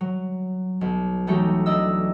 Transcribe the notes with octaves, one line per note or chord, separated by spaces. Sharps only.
F#3
B1
E3 F#3 A3 D#4 F#4 G4
D4 D#5 E6